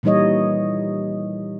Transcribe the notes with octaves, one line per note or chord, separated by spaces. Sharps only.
A#2 E3 G3 D#4 C#5 D#5